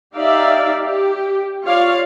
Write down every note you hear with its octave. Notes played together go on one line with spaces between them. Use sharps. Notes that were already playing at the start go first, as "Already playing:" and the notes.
D#4 G4 D5 E5 F5
G4
F4 C#5 D5 F5